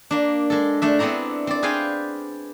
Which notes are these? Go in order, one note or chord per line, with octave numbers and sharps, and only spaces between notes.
A#3 D4
G#3 A4
A3 D4 E5
B3 C4 D4 E4 A#5
C4 D5
G#4 B4 C5 F5 G5 G#5